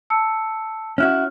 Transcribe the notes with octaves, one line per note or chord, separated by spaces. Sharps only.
A5 E6 C#7
C#4 E4 F#4 F6 F#6